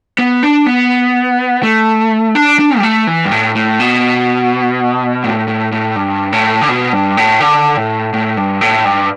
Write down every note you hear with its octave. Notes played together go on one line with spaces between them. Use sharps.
B3
D4
B3
A3
D4
D4
G3
A3
E3
G2
A2
A2
B2
A2
A2
A2
G2
A2
D3
B2
G2
A2
D3
A2
A2
G2
A2
G2